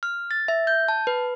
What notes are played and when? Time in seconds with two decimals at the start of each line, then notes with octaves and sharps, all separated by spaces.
0.03 F6
0.31 A6
0.48 E5
0.67 G6
0.88 A5
1.07 B4